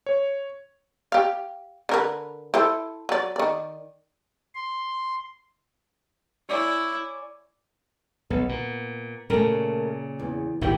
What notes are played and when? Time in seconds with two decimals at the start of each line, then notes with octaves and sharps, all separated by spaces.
0.06 C#5
1.12 G4 F5
1.89 D3 A#4 B4
2.54 E4 A4 C5
3.09 F#3 D5
3.36 D#3 D5
4.55 C6
6.49 E4 C#5 D5 G#5
8.30 B1 B3
8.49 A#2
9.30 A#2 C#3 A3 A#4
10.19 E2
10.61 G#1 A#2 D#3 E4 G4